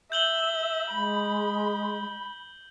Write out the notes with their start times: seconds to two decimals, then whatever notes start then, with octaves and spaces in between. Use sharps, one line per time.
0.12 E5 G6 F#7 G7
0.91 G#3 B5